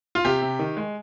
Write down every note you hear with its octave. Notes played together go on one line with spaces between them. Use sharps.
F4
C3 G4
C3
D#3
G#3